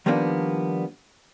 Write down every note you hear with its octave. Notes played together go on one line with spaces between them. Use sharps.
D#3 F3 G3 A#3 B3 D4